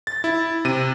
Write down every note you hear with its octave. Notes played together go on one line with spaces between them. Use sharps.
A6
E4
C3 D#7